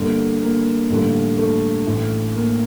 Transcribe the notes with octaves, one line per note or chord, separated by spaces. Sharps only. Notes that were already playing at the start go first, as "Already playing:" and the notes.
Already playing: G1 G2 D3 A#3
A#3
A1 G2 D3
A3
A1 A2
A#3